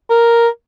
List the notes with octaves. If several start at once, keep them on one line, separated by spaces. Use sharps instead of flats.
A#4